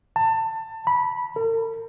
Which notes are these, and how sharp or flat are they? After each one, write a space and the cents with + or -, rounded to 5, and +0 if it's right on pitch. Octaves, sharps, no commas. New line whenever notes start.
A5 +25
B5 -15
A#4 -45